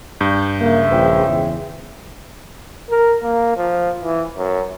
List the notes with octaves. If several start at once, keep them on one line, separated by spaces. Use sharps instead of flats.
G2 G6
C#3 G#3 A#3 E5
A#1 B4 C5 G5
E2
A#4
A#3
F3
E3
F#2